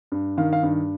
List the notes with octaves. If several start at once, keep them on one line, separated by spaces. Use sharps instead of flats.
G2
D#3 F5
F5
G2